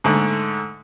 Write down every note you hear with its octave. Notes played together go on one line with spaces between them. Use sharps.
G#2 D3 A3